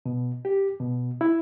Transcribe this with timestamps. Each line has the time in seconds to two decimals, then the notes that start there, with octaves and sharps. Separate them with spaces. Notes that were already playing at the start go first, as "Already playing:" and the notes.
0.06 B2
0.45 G4
0.80 B2
1.21 E4